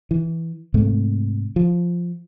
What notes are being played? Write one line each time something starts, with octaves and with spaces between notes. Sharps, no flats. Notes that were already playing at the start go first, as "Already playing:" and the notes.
E3
G#2 C3 A3
F3